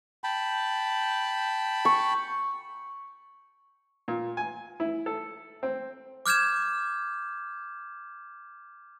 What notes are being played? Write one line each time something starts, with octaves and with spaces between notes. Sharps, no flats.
G5 A5 B5
C#6
A#2
G#5
E4
A4
C4
D6 F6 G6 G#6 E7